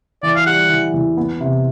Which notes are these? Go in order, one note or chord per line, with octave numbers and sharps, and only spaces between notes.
E3 D5
F5
G3 F#5
E3
E2
B3
C3